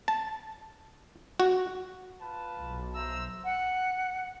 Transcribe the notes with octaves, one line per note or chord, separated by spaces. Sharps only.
A5
F#4
F4 B4 A5
B1
C5 E5 A#5 E6
F#5